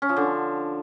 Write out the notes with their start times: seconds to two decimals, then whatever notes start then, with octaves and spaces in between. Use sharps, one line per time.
0.02 C#4
0.09 F3
0.16 D3